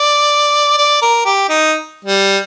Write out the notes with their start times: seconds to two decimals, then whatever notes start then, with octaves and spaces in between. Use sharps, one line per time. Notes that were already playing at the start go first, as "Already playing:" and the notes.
Already playing: D5
0.78 D5
1.02 A#4
1.26 G4
1.49 D#4
2.05 G3